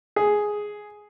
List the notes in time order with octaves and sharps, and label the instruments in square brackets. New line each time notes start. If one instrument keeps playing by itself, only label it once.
[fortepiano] G#4